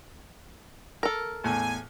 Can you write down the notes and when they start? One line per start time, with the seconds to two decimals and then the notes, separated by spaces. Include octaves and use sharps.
1.03 A4 A#4
1.44 E2 A2 G#5